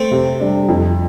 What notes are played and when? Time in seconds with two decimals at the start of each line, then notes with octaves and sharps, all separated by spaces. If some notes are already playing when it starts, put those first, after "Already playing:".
Already playing: A3 C4
0.11 C3
0.40 G3 D4
0.68 F2